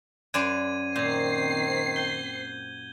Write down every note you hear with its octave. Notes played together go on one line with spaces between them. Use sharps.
F#2 C5 D5 G#6 D#7
A#2 D#3 C4 G6 G#6 C7
G6 G7